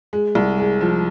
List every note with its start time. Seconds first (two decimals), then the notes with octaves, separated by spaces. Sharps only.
0.13 G#3
0.35 C2
0.58 G#3
0.81 F3